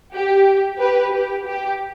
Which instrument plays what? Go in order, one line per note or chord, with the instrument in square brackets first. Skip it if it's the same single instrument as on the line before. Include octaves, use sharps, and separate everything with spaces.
[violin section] G4
G4 B4
G4
G4